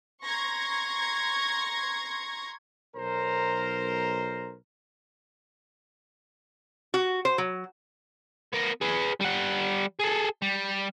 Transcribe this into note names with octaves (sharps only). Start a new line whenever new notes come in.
A#5 C6 C#6 G#6 A#6
B1 A#4 C5 A#5
F#4
C5
F#3
B3 A#4
G#4 B4
G3 F#5
G#4 A4
G3